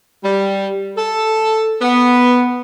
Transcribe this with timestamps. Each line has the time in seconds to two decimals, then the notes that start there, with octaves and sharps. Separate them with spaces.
0.23 G3
0.97 A4
1.82 B3